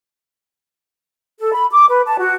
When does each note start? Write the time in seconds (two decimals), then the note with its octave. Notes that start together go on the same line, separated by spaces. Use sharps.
1.40 A4
1.53 B5
1.71 D6
1.88 B4
2.06 A5
2.18 F#4